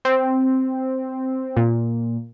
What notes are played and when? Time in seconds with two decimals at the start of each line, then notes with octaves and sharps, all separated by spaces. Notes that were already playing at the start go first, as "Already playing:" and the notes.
0.05 C4
1.56 A#2